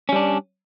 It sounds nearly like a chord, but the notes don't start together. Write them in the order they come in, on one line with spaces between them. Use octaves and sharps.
C#4 G3 D4